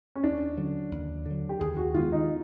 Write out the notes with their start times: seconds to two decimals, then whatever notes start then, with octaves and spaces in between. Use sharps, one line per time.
0.15 C#4
0.23 D#2 D4
0.57 D3 F#3
0.91 D#2
1.26 D3 F#3
1.49 G4
1.60 D#2 G#4
1.77 F#4
1.94 D#3 G#3 B3 F4
2.12 D#4